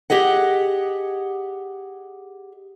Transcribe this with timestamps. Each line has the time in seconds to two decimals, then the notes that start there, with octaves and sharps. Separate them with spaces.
0.10 G4 G#4 D#5 F#5